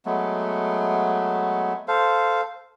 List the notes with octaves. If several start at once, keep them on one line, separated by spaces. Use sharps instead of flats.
F#3 G#3 A3 B3
A4 C5 F5